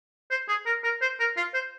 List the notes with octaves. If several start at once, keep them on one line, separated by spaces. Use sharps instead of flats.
C5
G#4
A#4
A#4
C5
A#4
F4
C5